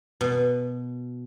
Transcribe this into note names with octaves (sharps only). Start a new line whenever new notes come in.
B2